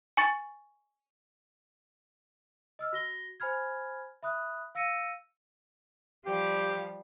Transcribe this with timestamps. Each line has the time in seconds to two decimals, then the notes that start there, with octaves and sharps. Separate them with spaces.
0.17 G#5 C#6 A6
2.79 D#5 E6 F6
2.93 F#4 A#6 G7
3.40 C5 G#5 B5 F6 G#6
4.23 E5 B5 D#6 F#6
4.75 F5 E6 A#6 C#7 D#7
6.26 F3 G3 G4